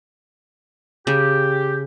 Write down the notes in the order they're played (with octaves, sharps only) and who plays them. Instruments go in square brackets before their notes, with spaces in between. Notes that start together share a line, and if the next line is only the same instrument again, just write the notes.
[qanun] C#3 [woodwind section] G4